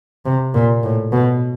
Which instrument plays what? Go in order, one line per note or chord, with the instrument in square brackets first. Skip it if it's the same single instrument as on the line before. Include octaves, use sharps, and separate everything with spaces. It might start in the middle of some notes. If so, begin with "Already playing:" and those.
[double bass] C3
A#2
A2
B2